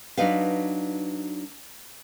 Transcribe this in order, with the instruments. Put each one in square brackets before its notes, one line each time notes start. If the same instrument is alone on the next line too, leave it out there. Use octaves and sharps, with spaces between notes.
[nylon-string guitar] F#3 D4 D#4 B4 F5